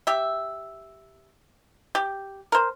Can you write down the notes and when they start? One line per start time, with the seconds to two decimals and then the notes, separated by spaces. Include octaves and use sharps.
0.07 G4 E5
1.95 G4
2.52 A#4 C5